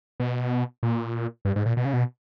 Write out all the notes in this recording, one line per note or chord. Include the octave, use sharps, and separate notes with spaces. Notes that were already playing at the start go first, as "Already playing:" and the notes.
B2
A#2
G2
G#2
A#2
B2
C#3
B2